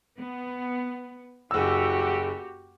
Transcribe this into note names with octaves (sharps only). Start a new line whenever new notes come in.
B3
F#1 F#4 G4 E6